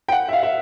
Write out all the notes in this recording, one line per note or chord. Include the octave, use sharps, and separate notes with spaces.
G5
F#5
E5
F5
E5